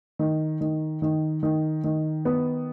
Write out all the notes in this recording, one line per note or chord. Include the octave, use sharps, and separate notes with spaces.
D#3
D#3
D#3
D#3
D#3
B3